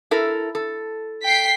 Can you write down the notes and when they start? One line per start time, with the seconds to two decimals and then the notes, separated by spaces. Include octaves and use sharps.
0.11 E4 A4 A#4
0.55 A4
1.23 G5 B6 C7